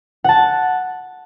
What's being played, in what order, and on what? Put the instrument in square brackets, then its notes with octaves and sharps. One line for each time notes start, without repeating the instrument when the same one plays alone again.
[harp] F#5 A5